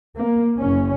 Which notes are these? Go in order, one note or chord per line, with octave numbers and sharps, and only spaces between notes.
A#3
F#1 C#4